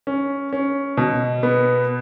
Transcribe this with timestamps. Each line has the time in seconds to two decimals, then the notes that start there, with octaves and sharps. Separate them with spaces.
0.07 C#4
0.53 C#4
0.97 B2
1.43 B3